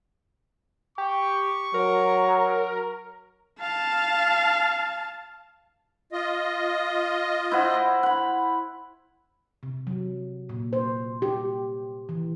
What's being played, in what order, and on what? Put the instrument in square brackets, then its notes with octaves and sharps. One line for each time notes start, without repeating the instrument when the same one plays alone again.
[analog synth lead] G4 [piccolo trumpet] C#6
[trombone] F#3 [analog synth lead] A#4
[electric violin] F5 A5
[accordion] F4 D#5
[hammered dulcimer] E4 C5 F#5
F#5 B5
[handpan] C3
F#3
A#2
C5
G4
E3